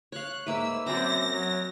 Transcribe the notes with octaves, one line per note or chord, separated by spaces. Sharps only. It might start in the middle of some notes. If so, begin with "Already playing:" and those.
C#5 F5 F#6
G#2 A#3 B4 E5 E6
F#2 C4 F#4 D5 A#6
F#3